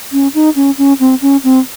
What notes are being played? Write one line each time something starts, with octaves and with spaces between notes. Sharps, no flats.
C#4
D#4
C#4
C#4
C4
C#4
C4